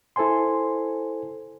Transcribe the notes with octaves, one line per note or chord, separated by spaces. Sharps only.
E4 A4 C5 G#5 C6